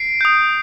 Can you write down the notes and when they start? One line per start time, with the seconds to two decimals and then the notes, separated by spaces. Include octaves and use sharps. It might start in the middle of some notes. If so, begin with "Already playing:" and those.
Already playing: C7 D7
0.21 D#6 G6